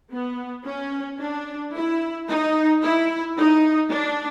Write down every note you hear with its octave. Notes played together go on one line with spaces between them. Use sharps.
B3
C#4
D4
E4
D#4
E4
D#4
D4